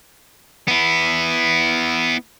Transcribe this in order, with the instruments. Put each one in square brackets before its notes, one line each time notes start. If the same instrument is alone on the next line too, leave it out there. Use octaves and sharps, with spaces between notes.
[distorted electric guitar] B3 E4